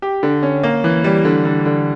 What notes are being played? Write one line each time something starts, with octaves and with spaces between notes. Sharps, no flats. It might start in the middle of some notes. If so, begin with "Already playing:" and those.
G4
D3
C#4
A#3
E3
G3
D3
D3
D3